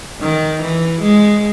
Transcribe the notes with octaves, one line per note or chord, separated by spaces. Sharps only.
D#3
E3
G#3